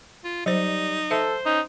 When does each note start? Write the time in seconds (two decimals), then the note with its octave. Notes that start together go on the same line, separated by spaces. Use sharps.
0.25 F4
0.46 F#3 G3 D#4 C5
1.11 A4 C5 E5
1.45 C#4 D#4